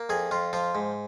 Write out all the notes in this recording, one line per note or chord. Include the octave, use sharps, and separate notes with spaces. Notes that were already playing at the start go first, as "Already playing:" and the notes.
Already playing: A#3
F2 G#4
F2 F4
F3 F4
G#2